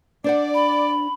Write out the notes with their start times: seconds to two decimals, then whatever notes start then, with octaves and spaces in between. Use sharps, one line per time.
0.24 D4 C5 D5 F#5
0.54 B5